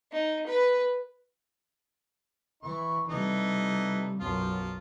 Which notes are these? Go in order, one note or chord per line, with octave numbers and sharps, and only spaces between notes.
D#4
B4
E3 E4 C#6
C3 E3 G3 A3 D#4
B1 F#2 F3 F4